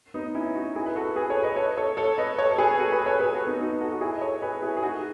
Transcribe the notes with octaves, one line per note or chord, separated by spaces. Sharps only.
B3 D#4
C#4 E4
D#4 F#4
E4 G#4
B4
F#4 A4
G#4 B4
A4 C#5
B4 D#5
A4 C#5
A4 C#5
A4 C#5
B4 D#5
A4 C#5
A4
G#4 B4
F#4 A4
G#4 B4
A4 C#5
G#4 B4
F#4 A4
B3 D#4
D#4 F#4
F#4 A4
F#4
E4 G#4
D#5
A4 C#5
G#4 B4
E4 G#4
G#4
D#4 F#4